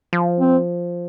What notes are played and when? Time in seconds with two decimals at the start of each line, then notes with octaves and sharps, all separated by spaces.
0.13 F3
0.40 C4